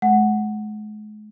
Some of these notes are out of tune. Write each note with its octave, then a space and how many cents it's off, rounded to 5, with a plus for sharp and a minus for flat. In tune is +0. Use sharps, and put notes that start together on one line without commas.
G#3 +40 F#5 +0